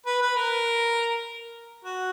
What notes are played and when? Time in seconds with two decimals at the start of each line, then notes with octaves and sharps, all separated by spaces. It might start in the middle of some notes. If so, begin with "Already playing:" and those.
0.06 B4
0.22 B4
0.36 A#4
1.85 F#4